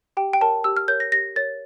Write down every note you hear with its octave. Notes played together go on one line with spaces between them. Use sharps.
G4 G5
G5
A#4 C#5 A5
G4 E6
F6
A#4 C#5 G6
A#6
G4 A#6
A#4 C#5 A6